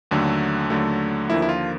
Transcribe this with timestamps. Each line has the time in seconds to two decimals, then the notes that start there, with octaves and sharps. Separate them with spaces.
0.11 D#2 D3 F#3 A3
0.70 D#2 D3 F#3 A3
1.30 D#2 D3 F3 A#3 E4
1.42 E4
1.49 F4